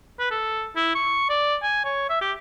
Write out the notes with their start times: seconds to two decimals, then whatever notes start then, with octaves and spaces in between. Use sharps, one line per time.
0.19 B4
0.31 A4
0.76 E4
0.95 C#6
1.29 D5
1.63 G#5
1.85 C#5
2.09 E5
2.21 G4